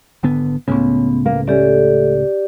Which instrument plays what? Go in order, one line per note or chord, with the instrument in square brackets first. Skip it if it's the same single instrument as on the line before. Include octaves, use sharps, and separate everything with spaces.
[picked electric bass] G#1 D3 B3
[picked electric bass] C#2 A2 C#3 [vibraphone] B3 [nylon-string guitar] C#4
[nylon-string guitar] A#3
[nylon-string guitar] A3 C#4 [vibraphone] G4 D5